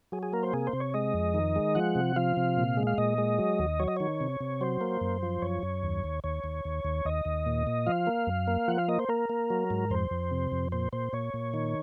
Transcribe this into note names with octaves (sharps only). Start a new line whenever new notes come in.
F#3 G#4
G#4
A#3 A#4
C5
C3 G#4
C5
C3
C#5
G#3 D#5
F2
D#3
G#3
F3 F#5
C3
F3 F5
C3
A#2
G#3
F5
A#2 D#5
G#3
F#3
D#2
F#3 C#5
D#5
D#3 C#5
C3
C3
F#3 C5
A#3
F#2
F3
F#2 C#5
F#2
D#2
D#2
D#2 C#5
D#2
D#2
D#2
D#2 D#5
D#2
A#2
A#2
F3 F5
A#3
F#2
A#3
F3 F#5
F5
A#3 D#5
C5
A#3 A#4
A#3
F#3
G#2
F2 C5
F2
C3
F2
A#2 C5
A#2 C5
A#2 C#5
A#2
D#3